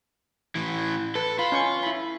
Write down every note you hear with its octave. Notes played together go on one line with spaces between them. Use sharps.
A2 E3
A4 B4
F4 B5
C#4 C#6
E4 B5